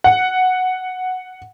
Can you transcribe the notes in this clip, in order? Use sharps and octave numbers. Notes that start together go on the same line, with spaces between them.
F#5